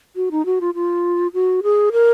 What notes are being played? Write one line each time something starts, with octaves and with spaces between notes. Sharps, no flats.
F#4
D#4
F#4
F4
F4
F#4
G#4
A#4